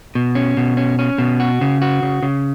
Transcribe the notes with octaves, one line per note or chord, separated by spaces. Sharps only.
B2
C#4
B2
C#4
C#4
B2
F#4
C#3
F#4
C#3
C#3